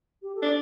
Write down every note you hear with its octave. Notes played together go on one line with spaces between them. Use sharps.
G4
A4
D4